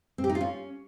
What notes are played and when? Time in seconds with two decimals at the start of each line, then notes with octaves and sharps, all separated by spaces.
0.18 C4
0.24 G4
0.29 D#4
0.35 F4
0.41 C#4